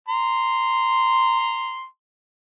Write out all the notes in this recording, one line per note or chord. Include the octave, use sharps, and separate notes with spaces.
A#5 C6